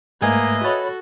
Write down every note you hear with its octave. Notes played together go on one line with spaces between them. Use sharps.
G#2 A3 A#3 B4 D#5 E5 G#5
F#4 A4 C#5 B5 A6